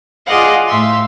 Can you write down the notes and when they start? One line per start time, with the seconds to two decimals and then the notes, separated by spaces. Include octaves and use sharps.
0.26 F4 G#4 D5 D#5 F5 F#5
0.67 A2 E5 F5 C6